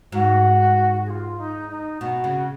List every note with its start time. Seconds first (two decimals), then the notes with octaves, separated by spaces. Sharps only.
0.12 G#2 F#4
1.06 G#4
1.10 F4
1.38 D#4
1.70 D#4
2.01 B2 F#4
2.24 C#3